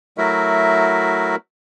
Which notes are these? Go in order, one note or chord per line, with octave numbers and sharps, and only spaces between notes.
F#3 A3 E4 F#4 A#4 E5